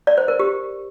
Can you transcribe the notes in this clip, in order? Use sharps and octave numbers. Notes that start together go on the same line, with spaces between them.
D5
C5
A#4
G4